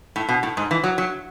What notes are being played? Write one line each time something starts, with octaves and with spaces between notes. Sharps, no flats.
A2
B2
A2
G#2
E3
F#3
F#3